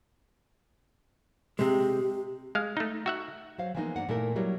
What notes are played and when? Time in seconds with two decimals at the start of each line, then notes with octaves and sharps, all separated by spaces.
1.59 C3 G#3 G4
2.55 G#3 F5
2.77 A3 D#4
3.06 F#4 E5 F#5
3.58 F#3 C5 F5
3.75 E3 F3 G#3 A#3 B3 D#4
3.96 G2 A#3 F#5
4.09 A#2 A3 A#3 E4 A#4
4.36 F#3 G3 A#3 E4 A#4